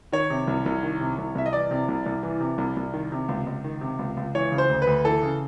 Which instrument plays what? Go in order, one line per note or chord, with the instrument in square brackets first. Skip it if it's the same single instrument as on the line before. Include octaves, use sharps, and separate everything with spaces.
[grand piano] D#3 C#5
C3
C2
C2
D#3
C3
C2
C2 E5
D#5
E3 D5
C3
C2
C2
E3
C3
C2
C2
D#3
C3
C#2
C#2
D#3
C3
C#2
C#2
E3 C#5
C#3
C5
D2
B4
D2
E3 A4
C#3